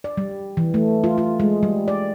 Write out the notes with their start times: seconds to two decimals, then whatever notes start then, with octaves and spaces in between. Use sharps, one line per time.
0.04 D5
0.17 G3
0.57 E3
0.74 A3
1.04 F4
1.18 F4
1.40 G#3
1.63 G3
1.88 D5